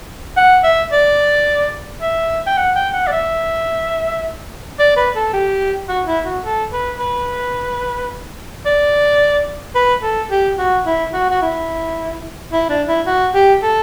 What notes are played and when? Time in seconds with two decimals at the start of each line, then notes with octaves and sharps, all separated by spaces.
0.37 F#5
0.64 E5
0.92 D5
2.02 E5
2.47 G5
2.57 F#5
2.76 G5
2.94 F#5
3.07 D5
3.12 E5
4.79 D5
4.97 B4
5.16 A4
5.33 G4
5.88 F#4
6.07 E4
6.25 F#4
6.45 A4
6.72 B4
6.99 B4
8.66 D5
9.75 B4
10.03 A4
10.31 G4
10.58 F#4
10.86 E4
11.14 F#4
11.30 F#4
11.42 E4
12.52 E4
12.70 D4
12.88 E4
13.06 F#4
13.34 G4
13.63 A4